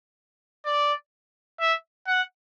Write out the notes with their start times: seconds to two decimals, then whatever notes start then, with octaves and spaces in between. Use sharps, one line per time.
0.65 D5
1.60 E5
2.07 F#5